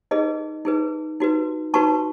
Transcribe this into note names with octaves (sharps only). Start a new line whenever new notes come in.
D#4 G#4 B4 D#5
D#4 G#4 B4
D#4 F#4 B4
D#4 F#4 B4 A5 C#6